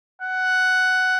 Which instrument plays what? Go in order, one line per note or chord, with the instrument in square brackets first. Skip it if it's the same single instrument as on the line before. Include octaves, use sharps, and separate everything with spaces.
[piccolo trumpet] F#5